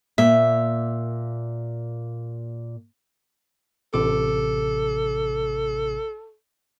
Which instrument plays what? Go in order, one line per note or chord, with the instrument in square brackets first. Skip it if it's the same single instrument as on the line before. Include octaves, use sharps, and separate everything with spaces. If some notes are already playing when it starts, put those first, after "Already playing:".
[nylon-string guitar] A#2 A#3 [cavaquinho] E5
[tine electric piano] A1 C3 D6 [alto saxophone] A4